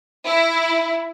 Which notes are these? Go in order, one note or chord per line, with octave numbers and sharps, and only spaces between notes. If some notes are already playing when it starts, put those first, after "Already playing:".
E4